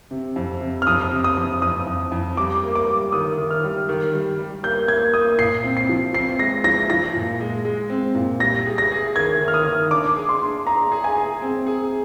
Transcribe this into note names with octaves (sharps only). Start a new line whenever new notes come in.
C3
F2
C3
F6
F2 D#6
C3
D#6
F2
F2 D#6
F2
F2
G3 D6
A#3
D6
G3
D#3 D#6
D#3
F6
G3
D#3
G3
G3
A#3 G6
A#3 G#6
A#3 D#6
A#2 C7
C4
C7
F3
C4 C7
G#3 A#6
F3 A#6
F3 A#6
A#2
G#3
G#3
C4
A#2
G3 A#6
G#4
A#6
G#4
D#3 G#6
D#3
F6
D#6
D#3
D4 D6
G#4
C6
D4
G#4 A#5
G#4
G#5
G#4
C4
G#4